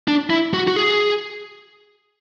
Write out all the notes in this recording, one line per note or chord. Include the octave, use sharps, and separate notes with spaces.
D4
E4
F#4
F#4
G#4